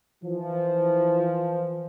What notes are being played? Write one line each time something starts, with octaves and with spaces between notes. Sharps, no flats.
E3 F3